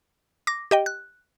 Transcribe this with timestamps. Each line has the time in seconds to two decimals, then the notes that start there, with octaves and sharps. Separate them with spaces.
0.47 D6 A#6
0.71 G4 D#5 G5
0.86 F#6